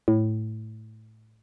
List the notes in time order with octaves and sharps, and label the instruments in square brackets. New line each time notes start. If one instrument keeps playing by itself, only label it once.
[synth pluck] A2